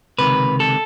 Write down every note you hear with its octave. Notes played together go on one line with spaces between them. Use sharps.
C#2 C3 D#3 B4
A4